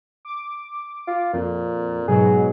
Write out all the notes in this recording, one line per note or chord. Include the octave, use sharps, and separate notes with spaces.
D6
F4
F2 A#2
G#2 B2 F#3 G#4